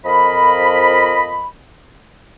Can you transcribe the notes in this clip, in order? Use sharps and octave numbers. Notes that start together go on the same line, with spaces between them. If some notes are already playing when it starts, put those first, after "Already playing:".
F2 F3 A#4 D#5 B5